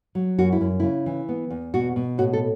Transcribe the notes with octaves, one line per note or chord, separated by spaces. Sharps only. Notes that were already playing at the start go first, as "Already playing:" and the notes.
F#3
F#2 F#4
E4
F#2
C#3 E4
E3
B3
E2
B2 F#4
B2
A2 F#4
A4